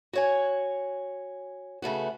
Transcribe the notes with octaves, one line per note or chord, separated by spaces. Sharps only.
F#4 C#5 G#5
C#3 A3 B3 F#4